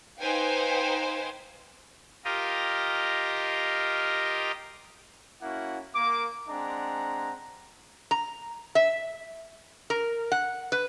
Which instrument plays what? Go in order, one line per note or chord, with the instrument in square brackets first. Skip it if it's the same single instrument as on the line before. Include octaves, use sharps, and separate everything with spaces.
[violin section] D#4 B4 C5 F5 G5 G#5
[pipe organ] F4 G4 A#4 D#5
[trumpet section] A#3 C#4 E4 F#4 F#5
A#3 D6
G#3 C4 D4 F#5 A#5
[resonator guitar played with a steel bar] A#5
E5
A#4
F#5
B4